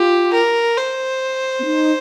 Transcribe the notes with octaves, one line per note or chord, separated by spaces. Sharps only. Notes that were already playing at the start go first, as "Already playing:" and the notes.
Already playing: F4 G4
A#4
C5
C4
D#4